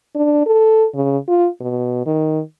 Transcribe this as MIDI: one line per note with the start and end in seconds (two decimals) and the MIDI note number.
0.15 0.45 62
0.46 0.86 69
0.94 1.17 49
1.28 1.48 65
1.60 2.01 47
2.06 2.40 51